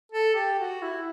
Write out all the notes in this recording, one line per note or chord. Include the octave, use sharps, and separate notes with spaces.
A4
G4
F#4
E4